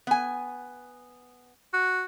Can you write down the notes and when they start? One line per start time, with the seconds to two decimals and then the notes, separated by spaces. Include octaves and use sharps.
0.07 B3 G#5
1.74 F#4